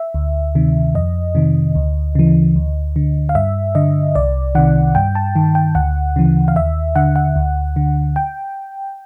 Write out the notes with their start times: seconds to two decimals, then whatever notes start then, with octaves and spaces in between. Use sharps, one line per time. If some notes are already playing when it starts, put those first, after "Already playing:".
Already playing: E5
0.14 D2
0.55 C3 D#3
0.95 F2 D#5
1.35 C3 D#3
1.75 D2
2.15 C#3 E3
2.56 D2
2.96 D3
3.29 F5
3.35 G2 E5
3.75 D3 D#5
4.15 C2 D5
4.55 C3 D#3 F#5
4.95 G2 G5
5.15 A5
5.36 D#3
5.55 G5
5.75 D2 F#5
6.16 C#3 E3
6.48 F5
6.55 D#2 E5
6.96 D3 F#5
7.16 F#5
7.36 D2
7.76 D3
8.16 G5